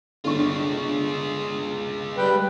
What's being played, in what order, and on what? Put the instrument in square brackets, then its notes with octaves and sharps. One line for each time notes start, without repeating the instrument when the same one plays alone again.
[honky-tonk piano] G1 D4 C#6 [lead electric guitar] G#3 F4
[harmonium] G3 B4 G5